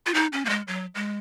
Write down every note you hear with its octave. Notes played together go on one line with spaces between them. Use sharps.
F4
D#4
C#4
A#3
G#3
F#3
G#3